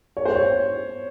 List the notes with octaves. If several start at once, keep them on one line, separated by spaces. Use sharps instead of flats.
C#5
C5
C#5